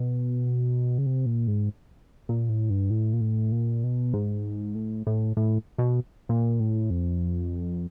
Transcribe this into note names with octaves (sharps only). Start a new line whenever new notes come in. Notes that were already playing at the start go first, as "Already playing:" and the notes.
Already playing: B2
C#3
C3
A#2
G#2
A#2
A2
G2
A2
A#2
A2
A#2
B2
G#2
A2
A2
A2
B2
A#2
A2
F2